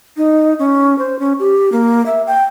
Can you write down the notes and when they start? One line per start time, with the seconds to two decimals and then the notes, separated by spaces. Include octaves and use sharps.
0.17 D#4
0.59 C#4
0.99 C5
1.19 C#4
1.39 G4
1.72 A#3
2.06 E5
2.27 G5